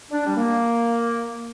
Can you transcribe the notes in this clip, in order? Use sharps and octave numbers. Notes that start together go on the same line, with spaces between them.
D4
G3
A#3